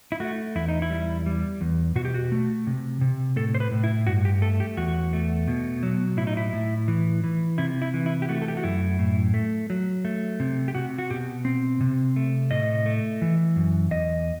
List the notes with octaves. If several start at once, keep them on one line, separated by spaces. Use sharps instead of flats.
E4
A3 F#4
E2 E4
D#4
E4
G3
G3
E2
B2 F#4
G4
F#4
A3
C3
C3
A2 A4
C5
B4
A2
E4
G2 F#4
G4
A3 A4
G4
E2 F#4
A3
B2
F#3
A2 E4
D#4
E4
A2
E3
E3
C3 E4
E4
E3
E4
G4
A3 F#4
A4
G4
F#4
F#2 E4
A2
A3
F#3
A3
C3
G4
C3 F#4
F#4
B2 G4
C4
C3
A3
A2 D#5
A3
E3
F#2
E2 D#5